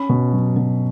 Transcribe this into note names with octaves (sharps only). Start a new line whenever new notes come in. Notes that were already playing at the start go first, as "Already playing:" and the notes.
Already playing: C#4 B5
B2
F#3
B2